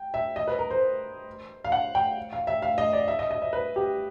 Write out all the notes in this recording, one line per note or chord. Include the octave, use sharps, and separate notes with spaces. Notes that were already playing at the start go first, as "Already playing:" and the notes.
Already playing: G5
E5
D#5
B4
A#4
C5
F5
F#5
G5
F5
E5
F5
D#5
D5
E5
D#5
D#5
E5
B4
G4